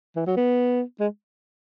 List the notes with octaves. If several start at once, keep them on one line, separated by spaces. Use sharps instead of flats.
E3
F#3
B3
G#3